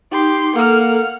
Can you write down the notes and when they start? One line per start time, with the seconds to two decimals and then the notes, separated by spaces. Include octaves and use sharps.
0.12 D#4 G4 C6
0.56 A#3 A4 F#5 F6